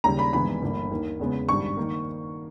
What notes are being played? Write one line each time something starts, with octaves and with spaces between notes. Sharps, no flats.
D#2 C#3 G3 A#5
B5
G#1 G2 E3 G#3 B3 B5
G1 G2 E3 A#3
D#2 D#3 A#3
E2 C#3 G#3 B3
G#1 G2 G3 C#6
D#3 A#3